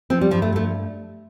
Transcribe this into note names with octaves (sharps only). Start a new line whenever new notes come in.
F3 C4
G3
G2 F3
A3
F3 A3